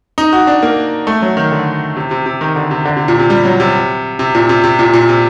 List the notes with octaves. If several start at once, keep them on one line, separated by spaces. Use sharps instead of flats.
D#4
F#4
D4
A#3
A3
F#3
D#3
D3
C3
C3
C3
D#3
D3
C3
D3
C3
A#2
C3
G3
F#3
C3
C3
A#2
C3
C3
A#2
A#2
C3